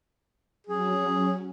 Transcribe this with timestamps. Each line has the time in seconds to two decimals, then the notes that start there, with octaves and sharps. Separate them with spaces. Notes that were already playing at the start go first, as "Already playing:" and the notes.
0.67 F#3 C#4 G#4